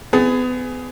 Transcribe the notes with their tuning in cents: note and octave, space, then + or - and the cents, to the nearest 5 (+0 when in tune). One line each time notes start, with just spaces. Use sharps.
B3 +30 G#4 +5